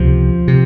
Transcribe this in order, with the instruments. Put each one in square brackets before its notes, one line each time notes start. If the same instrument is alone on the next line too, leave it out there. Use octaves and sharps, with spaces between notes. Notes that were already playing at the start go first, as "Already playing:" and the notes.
Already playing: [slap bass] C#2 C3 F3
C3